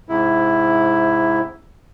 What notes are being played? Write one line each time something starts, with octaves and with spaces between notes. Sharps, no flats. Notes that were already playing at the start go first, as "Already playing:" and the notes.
G#2 C3 E4